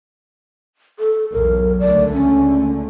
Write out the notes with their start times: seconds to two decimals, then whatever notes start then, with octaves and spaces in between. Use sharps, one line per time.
0.99 A4
1.32 B1 E2 F#3 A#4
1.80 C#2 D3 A3 D5
2.13 C#4